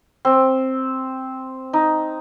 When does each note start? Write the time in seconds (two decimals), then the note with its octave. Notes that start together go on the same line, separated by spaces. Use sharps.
0.25 C4
1.73 D#4